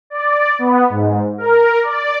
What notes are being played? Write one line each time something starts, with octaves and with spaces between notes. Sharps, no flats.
D5
B3
G#2
A#4
D5